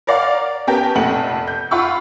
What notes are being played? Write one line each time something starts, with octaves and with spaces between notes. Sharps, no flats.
A#4 C#5 D5 F5 F#5
B3 C#4 G4 A#4 G5 A5
F1 F2 A#2 A3 F#5 F#7
G6
F4 F#5 B5 C#6 E6